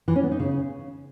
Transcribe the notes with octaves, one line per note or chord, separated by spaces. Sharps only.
E3
C#4
B3
D#4
C#3